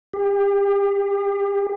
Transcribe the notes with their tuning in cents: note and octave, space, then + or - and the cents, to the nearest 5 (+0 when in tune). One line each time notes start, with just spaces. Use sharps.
G4 +35